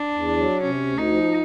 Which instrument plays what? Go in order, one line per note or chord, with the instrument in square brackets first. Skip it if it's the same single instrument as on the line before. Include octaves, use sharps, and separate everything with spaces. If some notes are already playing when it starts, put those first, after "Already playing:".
Already playing: [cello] D4
[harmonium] E2
F#3
[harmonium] C3 [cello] C#4
[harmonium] D2
[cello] D#4
[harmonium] F3